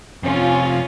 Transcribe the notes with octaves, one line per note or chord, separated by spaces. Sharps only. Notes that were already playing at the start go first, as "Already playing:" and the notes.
F2 C3 C#4 F4